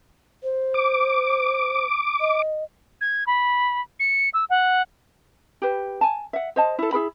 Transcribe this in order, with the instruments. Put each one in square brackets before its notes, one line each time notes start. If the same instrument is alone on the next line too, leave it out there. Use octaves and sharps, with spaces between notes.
[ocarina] C5
[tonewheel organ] D6
[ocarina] D#5
[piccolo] G#6
B5
C#7
E6
F#5
[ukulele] G4 B4
G#5 A5
E5 F#5
C5 D#5 A5
E4 A4
E4 G#4 A#4 B5